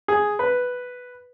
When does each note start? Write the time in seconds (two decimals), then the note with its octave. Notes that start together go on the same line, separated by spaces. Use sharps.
0.08 G#4
0.39 B4